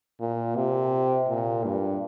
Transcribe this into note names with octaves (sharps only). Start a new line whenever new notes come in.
A#2
C3
A#2
G2